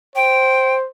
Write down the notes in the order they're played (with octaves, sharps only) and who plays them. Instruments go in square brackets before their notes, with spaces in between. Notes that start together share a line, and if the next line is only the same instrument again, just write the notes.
[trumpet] C5 [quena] G5